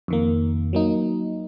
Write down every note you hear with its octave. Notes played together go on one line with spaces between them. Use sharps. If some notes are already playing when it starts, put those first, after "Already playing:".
F2 D#3 A#3
F#3 A#3 D#4